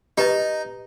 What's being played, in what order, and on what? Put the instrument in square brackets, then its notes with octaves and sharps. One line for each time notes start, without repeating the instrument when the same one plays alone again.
[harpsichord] D#4 [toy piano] G4 B4 D#5